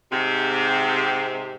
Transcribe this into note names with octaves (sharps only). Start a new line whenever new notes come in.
G#2 C3